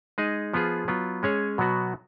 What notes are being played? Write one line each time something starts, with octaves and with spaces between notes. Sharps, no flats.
G#3 D#4 G#4 D#5
F3 B3 F4 G#4
F#3 B3 F4
G#3 C#4 G#4 C#5
B2 F#3 B3 F#4